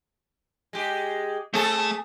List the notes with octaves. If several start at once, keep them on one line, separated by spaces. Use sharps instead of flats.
G#3 G4
A3 C4 G#4 A4 A5